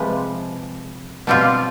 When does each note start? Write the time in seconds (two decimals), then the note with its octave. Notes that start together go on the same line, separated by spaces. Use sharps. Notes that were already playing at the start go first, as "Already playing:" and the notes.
Already playing: C3 F3 G#3 B4
1.27 B2 G3 C4 F4